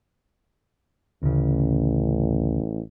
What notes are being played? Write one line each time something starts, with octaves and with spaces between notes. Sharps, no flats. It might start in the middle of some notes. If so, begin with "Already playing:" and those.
A1 D2 C#3